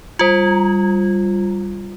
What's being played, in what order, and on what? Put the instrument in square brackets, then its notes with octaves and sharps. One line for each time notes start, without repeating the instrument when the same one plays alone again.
[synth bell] G3 F4